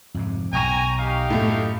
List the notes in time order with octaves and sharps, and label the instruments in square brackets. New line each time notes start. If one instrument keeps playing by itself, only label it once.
[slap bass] F2 G#2 C3
[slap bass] B1 [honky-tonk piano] G5 C#6 D#7 [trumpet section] G#5 A#5
[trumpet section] D#4 G4 F5
[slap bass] F#2 [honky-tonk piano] A2 A3